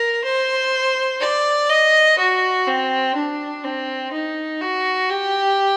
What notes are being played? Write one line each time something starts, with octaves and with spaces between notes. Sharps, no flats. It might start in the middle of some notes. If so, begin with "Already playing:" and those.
Already playing: A#4
C5
D5
D#5
F#4
C4
D4
C4
D#4
F#4
G4